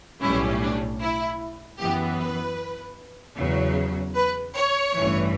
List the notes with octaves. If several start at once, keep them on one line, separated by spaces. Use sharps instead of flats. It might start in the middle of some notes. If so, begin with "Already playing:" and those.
B1 A2 G3 C#4 E4
D4
E4
F#2 E3 B3 G4
B4
E2 C#3 F#3
B4
C#5
A1 G2 E3